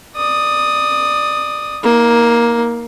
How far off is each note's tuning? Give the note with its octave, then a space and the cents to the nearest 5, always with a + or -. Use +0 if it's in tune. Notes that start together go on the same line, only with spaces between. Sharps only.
D5 +20 D#6 +0
A#3 +10 D#4 +40